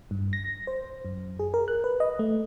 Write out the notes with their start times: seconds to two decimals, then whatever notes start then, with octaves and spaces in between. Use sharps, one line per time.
0.11 G2
0.33 A#6
0.67 C5
1.05 F#2
1.39 G#4
1.54 A#4
1.68 F#6
1.84 B4
2.00 D#5
2.19 A3